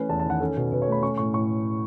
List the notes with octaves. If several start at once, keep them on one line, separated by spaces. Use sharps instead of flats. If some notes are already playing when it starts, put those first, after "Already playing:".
Already playing: E3 A3 C#4 B4
E2 A5
A5
D#3 F#5
C#4 A4
B2
B2 B4
C#5
A3
B5
C#4 C#6
A2 C#6
A2 C#6